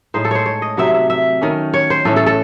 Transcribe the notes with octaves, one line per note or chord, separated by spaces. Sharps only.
A2 G#3 D#4 C5
A4
C5 C#5
C#5
D#5
C3 F#3 C4 D#4 E5
E5
E5
D#3 A3 C#4
C#5
C5
A2 E3 A3 C#4 A4
A4
A4